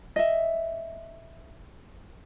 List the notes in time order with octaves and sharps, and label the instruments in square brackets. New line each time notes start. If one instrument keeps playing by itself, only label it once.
[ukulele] D#5 E5